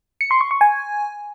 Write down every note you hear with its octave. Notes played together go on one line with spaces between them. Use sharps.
C#7
C6
C#6
C#6
G#5